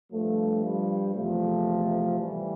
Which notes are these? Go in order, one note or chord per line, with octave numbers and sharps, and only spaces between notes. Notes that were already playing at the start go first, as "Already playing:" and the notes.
G2 F3 A3
G3
E2 C3 F3 A3
A2 E3 G3